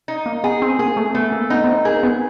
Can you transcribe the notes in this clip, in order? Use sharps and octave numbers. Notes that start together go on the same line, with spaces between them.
D#4
A#3
B3 G#4
C4
A#3 G#4
A3
A3 B3
A#3
B3 D#4
B3
C4
A#3 G#4
B3